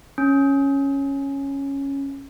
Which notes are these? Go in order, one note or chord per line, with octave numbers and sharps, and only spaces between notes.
C#4